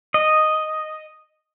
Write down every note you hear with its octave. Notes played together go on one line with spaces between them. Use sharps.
D#5